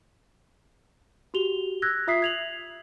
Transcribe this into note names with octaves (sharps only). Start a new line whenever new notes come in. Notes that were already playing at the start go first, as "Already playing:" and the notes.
F#4 G4 F7 G7
E6 F#6 G#6 A#6
F4 E5 D#6 B6 C7
G#6 F7 F#7